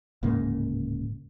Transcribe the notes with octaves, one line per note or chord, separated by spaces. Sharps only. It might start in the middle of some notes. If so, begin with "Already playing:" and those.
D1 G#2 C#3 A#3